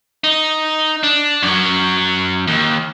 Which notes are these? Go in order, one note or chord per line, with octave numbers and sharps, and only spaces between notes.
D#4
D4
F#2 F#3
D#2